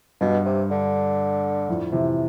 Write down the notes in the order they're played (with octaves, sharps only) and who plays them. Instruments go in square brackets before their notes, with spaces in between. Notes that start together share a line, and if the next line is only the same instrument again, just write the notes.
[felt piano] G2 [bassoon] B2
[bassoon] C3
D3
[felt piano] F2 A2
C3 E3